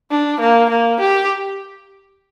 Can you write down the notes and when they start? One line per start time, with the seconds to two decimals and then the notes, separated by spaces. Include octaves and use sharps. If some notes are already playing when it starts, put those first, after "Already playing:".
0.11 D4
0.40 A#3
0.70 A#3
1.00 G4